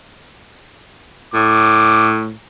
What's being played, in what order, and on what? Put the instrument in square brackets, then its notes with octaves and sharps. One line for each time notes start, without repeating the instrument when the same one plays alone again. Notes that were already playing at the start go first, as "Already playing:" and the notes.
[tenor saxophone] A2 [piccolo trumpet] D6